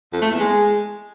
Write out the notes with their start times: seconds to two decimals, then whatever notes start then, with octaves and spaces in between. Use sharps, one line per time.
0.13 F2
0.22 A3
0.31 E2
0.40 G#3